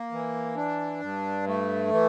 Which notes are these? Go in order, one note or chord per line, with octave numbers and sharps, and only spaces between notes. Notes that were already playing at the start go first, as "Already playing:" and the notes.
Already playing: A#3
E3
D4
G2
A3
E3